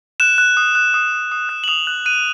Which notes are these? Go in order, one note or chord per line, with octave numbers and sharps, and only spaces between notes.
F#6 E7
F#6
D#6
F#6
D#6
D#6
D#6
F#6
F#7
D#6 F7
F#6
F#6 D#7